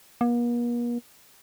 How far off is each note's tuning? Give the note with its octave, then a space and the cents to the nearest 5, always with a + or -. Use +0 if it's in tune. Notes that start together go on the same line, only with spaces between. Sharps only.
A#3 +45